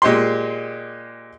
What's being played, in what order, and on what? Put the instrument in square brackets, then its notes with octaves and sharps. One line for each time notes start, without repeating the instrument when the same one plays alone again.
[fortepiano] A#2 G#3 G4 C6